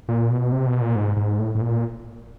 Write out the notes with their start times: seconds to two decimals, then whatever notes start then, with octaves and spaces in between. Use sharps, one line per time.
0.09 A#2
0.31 B2
0.52 C3
0.67 B2
0.81 A#2
0.96 G#2
1.17 G#2
1.39 A2
1.55 A2
1.61 A#2